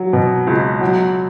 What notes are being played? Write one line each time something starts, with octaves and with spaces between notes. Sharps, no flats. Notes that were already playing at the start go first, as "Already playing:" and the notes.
Already playing: F#3
B2
C#2
F#3